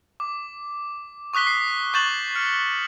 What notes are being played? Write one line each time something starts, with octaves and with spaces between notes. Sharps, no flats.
D6
C#6 D#6 F#6 B6 G7
C7
C#6 G6 A6 E7 F#7
F6 C#7